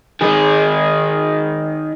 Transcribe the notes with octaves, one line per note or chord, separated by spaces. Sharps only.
D#3 G#4